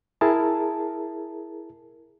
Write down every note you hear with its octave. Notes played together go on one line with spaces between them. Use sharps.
E4 G#4 A#4 A5